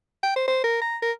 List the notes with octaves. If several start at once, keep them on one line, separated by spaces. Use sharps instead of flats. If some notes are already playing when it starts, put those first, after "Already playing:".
G5
C5
C5
A#4
A#5
A#4